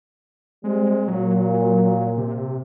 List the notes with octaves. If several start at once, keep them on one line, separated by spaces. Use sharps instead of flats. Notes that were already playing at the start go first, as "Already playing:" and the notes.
G3 G#3 C4
A#2 F#3
C3